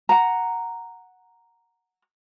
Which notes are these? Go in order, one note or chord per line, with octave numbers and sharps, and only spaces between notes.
F#5 A#5